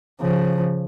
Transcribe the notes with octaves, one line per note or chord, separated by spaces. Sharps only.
C#3 F3